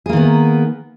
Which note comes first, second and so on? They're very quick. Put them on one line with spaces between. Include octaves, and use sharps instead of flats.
G#4 A#3 D#3 B3